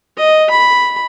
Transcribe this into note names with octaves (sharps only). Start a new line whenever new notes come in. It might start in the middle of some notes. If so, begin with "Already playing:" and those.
D#5
B5